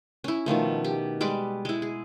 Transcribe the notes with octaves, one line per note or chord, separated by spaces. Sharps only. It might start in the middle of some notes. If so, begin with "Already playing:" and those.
C#4 E4
B2 D#3 F3 A3
G4
G3 G#3 B4 D6
G#3 E4
G#4